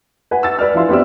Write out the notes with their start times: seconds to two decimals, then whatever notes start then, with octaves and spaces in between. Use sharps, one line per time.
0.31 B4 F#5 G#5
0.43 E6 A6
0.59 B4 D5 F6
0.74 F3 E4 F5 C6
0.89 B3 C4 G4 D5 E6